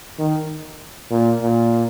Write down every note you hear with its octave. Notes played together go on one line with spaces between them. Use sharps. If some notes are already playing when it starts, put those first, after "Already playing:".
D#3
A#2
A#2